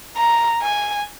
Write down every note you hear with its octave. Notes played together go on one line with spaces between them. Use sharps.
A#5
G#5